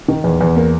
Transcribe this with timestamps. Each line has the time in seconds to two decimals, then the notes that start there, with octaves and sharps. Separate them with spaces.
0.08 D#3
0.24 E2
0.41 E2
0.56 A#3